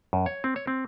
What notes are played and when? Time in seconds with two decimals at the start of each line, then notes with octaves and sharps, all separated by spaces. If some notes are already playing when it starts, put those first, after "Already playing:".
0.13 F#2
0.26 C#5
0.44 C4
0.56 C#5
0.67 C4